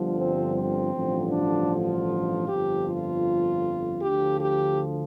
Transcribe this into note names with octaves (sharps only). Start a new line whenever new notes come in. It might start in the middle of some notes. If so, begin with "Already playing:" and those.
Already playing: G1 G2 D3 F3
C4
C4
A1 G2 D3 F3
D4
F4
G1 F2 F3 G4
F4
D2 D3 F3 G4
G4